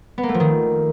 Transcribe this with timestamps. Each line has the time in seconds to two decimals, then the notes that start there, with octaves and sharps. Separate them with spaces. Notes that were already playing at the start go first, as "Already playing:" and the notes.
0.18 B3
0.23 A#3
0.29 A3
0.34 F3
0.40 D#3